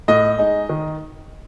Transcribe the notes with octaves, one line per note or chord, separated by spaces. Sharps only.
A2 D#5
G#3 D#4
D#3